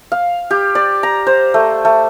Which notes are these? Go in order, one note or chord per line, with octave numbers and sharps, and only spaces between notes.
F5
G4
D5
A#5
C5
A3
A3